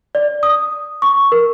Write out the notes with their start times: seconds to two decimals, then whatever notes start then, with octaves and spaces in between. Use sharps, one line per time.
0.15 D5
0.43 D#6
1.02 C#6
1.32 A#4